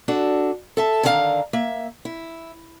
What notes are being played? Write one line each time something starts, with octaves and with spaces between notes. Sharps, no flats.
D4 F#4 A4
A4 E5 A5
D3 D#3 D4 G4 F5 A#5
A#3 E5
E4